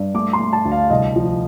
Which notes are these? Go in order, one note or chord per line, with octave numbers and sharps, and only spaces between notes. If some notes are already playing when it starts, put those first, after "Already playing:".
Already playing: G2
A3 D6
C6
A3
A5
D2
F5
C2 D#5
F3